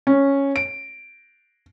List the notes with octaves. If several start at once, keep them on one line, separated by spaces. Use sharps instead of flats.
C#4
D7